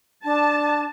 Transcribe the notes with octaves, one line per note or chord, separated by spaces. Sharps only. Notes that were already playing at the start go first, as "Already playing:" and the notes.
D4 A5